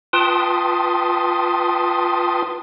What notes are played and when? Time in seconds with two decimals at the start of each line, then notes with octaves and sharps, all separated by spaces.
0.13 F4 B4 G5 A5 C6 D#6